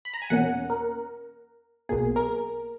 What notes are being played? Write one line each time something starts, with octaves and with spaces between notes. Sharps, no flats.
B5
A#5
G#5
E2 B2 A#3 C#4 F#5
A#4
B1 B2 A#3 G#4
A#4